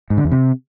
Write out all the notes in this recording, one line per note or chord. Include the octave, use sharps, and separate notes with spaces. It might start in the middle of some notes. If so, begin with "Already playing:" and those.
G#2
D3
E2
C3